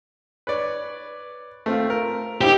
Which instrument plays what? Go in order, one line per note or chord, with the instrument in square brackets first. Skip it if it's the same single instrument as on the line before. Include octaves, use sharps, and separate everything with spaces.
[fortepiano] B4 C#5 D5
A3 C4 F4
A#4
[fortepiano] D#4 E4 C5 [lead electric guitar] G4